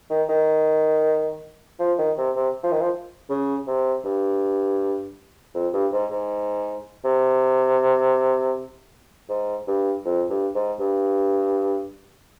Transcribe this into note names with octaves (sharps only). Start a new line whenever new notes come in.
D#3
D#3
F3
D#3
C3
C3
F3
D#3
F3
C#3
C3
G2
F2
G2
G#2
G#2
C3
G#2
G2
F2
G2
G#2
G2